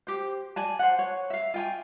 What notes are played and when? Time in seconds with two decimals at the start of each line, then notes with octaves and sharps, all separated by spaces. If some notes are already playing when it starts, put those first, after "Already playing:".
0.07 G4 C5
0.56 D5 G#5 A5
0.79 C5 F#5
0.99 C#5
1.30 E5 F5
1.54 F4 G5 G#5